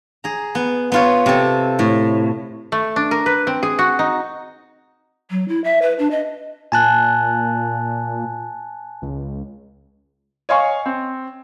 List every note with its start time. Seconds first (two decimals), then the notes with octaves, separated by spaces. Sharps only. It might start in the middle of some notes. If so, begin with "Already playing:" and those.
0.24 G#4 A#5
0.55 B3
0.92 B3 F4 C#5
1.26 C3 A4
1.79 A2
2.72 A3
2.96 D4
3.11 A#4
3.26 B4
3.47 C4
3.63 G#4
3.79 F#4
3.99 D#4
5.30 F#3
5.48 E4
5.64 E5
5.82 B4
5.99 D4
6.11 D#5
6.72 A#2 G#5 A5 F#6
9.02 C#2
10.49 C#5 D#5 F5 G#5 C#6
10.86 C4